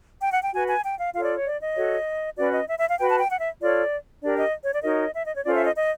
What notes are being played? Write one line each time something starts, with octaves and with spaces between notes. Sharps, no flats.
G5
F#5
G5
F#4 B4 G#5
G#5
G5
F5
F4 A4 C#5 F5
D5
C#5
D5
D#5
F#4 A4 C#5
C#4 F#4 B4 D5
D#5
E5
E5
F5
F#4 B4 G5
A5
G5
F#5
E5
F4 A4 C#5 D5
D4 G4 A#4 D5
D#5
C#5
D5
D#4 F#4 A#4 C#5 D#5
E5
D#5
C#5
C#4 F4 A4 C5 D5
E5
D#5
D#5